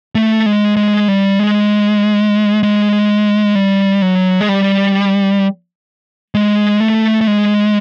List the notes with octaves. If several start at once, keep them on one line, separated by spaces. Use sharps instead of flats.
A3
G#3
G#3
G3
G#3
G#3
G3
F#3
G#3
G3
G#3
A3
A3
G#3